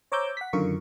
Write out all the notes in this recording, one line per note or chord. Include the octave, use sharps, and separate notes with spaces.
C5 C#5 A#5 D6 E6 G6
F#5 B6
F#2 D3 D#3 F4 A#4 C#6